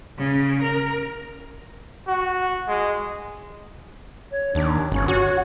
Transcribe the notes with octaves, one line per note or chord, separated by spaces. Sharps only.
C#3
A#4
F#4
G#3
C#5
D#2 D4
G1 C#4
F#4 C#5